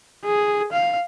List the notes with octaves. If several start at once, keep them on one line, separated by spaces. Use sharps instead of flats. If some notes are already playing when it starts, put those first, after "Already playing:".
G#4
F5